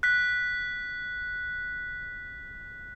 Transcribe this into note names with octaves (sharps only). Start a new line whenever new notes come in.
F#6 B6